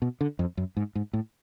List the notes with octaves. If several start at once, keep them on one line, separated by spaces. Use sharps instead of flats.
B2
D3
F2
F#2
G#2
G#2
A2